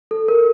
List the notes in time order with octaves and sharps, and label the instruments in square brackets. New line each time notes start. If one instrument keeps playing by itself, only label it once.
[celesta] A4
A#4